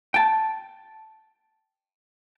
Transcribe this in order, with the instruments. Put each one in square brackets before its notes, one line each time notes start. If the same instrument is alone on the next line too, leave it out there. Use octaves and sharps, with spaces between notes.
[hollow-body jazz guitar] G5 A5